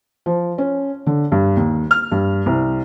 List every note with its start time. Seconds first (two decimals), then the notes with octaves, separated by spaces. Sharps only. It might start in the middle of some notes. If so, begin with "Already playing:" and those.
0.26 F3
0.58 C#4
1.06 D3
1.32 G2
1.56 D#2
1.91 F6
2.12 G2
2.46 C2